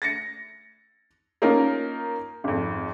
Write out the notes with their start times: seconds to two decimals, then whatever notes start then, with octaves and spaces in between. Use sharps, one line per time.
0.02 A6 A#6 C#7
1.42 A#3 C#4 D#4 F4 A#4
2.44 G#1 F2